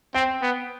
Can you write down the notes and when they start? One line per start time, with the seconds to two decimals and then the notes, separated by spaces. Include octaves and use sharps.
0.14 C4 G5
0.42 B3